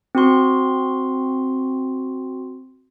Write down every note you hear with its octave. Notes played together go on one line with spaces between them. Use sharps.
C4 F#4 C6